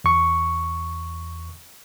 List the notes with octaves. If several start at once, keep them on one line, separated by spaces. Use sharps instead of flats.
E2 C#6